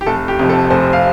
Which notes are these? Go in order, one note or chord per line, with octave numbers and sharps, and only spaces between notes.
G4
F1 A4
G4
F2 C3 F3
A4
F1 C5
F5